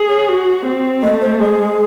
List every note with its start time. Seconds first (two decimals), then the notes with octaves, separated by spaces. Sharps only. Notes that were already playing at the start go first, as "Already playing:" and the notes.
Already playing: G#4
0.09 C#5
0.28 F#4
0.65 C4
1.03 A3 D#5
1.21 C5
1.40 G#3 G#4